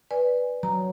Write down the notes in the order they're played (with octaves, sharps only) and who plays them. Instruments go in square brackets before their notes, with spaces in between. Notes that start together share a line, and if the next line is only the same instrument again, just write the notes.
[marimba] B4 D5 G#5
[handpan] F#3 [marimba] A#5